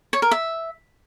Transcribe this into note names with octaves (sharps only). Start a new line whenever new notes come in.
C#5
A#4
E5